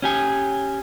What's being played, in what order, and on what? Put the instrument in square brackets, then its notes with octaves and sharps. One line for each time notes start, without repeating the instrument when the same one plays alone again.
[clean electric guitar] C#4 G4 G#5